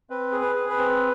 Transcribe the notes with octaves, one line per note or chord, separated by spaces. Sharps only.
C4 B4
G#4
B4
G#4
B4
C4